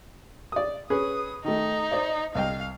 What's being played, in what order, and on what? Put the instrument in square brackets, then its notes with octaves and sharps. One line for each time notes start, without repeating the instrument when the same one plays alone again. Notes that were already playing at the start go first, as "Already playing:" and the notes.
[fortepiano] D5 D#6
[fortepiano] C#4 G#4 B4 [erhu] D#6
[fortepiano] D#3 A3 [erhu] D#4
[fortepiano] C5 D5 D#5
[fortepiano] C2 D#5 G5 [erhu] F5